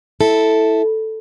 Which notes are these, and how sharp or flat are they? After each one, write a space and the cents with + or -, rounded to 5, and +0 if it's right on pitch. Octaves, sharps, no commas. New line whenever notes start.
E4 -10 A4 +0